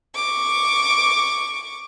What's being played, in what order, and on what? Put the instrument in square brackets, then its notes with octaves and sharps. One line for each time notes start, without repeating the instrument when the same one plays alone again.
[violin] C#6 D6